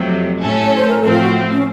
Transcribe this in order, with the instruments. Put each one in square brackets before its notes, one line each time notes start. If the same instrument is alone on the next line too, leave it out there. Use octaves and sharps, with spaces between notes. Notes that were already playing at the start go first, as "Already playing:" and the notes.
Already playing: [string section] F2 C3 F#3 A3
A2 A3 C#4 A4
[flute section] C#5
C5
A#4
[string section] A2 F3 C4 [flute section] A4
[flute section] F4
F#4
C#4